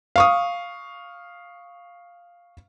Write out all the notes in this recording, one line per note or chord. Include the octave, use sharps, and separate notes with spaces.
F5 C#6 D#6